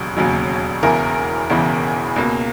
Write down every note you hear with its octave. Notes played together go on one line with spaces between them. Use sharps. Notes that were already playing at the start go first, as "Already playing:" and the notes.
Already playing: E1 D#2 C#3 F#3
E1 D#2 C#3 F#3
E1 E2 C#3 E3 A#4
E1 E2 C#3 E3
C#2 B2 A#3